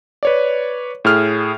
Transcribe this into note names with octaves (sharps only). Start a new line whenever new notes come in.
B4 C#5 D5
A2 G#4 F6